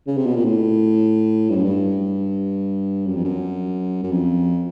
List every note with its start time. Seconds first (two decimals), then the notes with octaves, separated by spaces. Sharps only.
0.07 C#3
0.17 C3
0.26 B2
0.36 A#2
0.45 A2
1.50 G2
1.56 F#2
1.64 G2
3.07 F#2
3.16 F2
3.25 F#2
4.03 F#2
4.11 F2